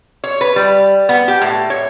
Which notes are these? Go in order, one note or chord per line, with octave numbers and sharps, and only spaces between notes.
C#5
B4
G3
B3
G4
A2
C#5